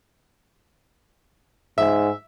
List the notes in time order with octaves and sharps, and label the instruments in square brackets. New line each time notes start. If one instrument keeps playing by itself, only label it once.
[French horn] G#2 [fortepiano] E5